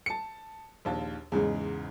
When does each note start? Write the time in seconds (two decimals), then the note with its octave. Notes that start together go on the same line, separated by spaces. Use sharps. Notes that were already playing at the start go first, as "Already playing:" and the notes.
0.06 A5 C#7
0.85 A#1 D#2 A5
1.32 E2 G#2 C#3 G#3